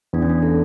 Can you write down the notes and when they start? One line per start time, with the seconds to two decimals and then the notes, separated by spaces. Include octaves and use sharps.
0.13 E2 D4
0.22 C#4
0.29 D4
0.42 A4